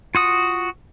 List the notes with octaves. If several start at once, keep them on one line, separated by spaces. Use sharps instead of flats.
F4 F#4 D#6